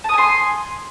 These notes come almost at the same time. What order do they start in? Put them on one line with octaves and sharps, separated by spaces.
A5 D#6 G#5 C6